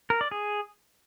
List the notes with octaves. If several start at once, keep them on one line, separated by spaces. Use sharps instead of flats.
A#4
D5
G#4